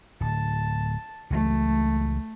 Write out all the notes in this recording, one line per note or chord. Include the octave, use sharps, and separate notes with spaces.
D1 A5
C#2 E3 F#3 A3